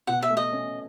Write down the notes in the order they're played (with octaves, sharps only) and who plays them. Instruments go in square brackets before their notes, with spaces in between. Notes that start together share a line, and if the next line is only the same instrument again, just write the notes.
[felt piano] B2 [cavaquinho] F#5
[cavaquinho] E5
[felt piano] A3
[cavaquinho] D#5
[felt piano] C#4